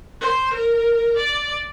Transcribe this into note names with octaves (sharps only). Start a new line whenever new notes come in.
C5
A#4
D5